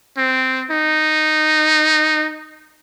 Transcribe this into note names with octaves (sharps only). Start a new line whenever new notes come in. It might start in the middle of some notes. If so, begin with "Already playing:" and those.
C4
D#4